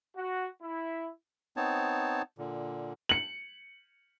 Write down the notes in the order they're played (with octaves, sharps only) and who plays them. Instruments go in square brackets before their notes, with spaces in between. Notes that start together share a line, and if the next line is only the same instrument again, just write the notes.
[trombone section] F#4
E4
[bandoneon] B3 C4 D#4 C#5 A5
A#2 D3
[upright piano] C#7 F#7